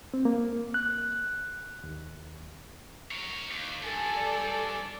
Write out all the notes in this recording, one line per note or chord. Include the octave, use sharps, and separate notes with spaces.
C4
A#3
F#6
D#2
A#4 C#5
D#2
E2 G2 A4 G#5
D5